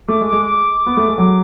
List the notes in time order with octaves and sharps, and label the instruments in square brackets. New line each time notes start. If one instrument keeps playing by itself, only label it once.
[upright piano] A3 [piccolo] D6
[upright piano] G#3
[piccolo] D6
[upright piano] G#3
[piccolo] D6
[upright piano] B3
A3
G#3
[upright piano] F#3 [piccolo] D6